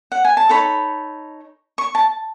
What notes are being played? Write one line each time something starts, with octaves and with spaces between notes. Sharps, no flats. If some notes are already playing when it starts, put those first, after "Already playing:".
F#5
G#5
A5
D#4 A4 C#5 B5
C#6
A5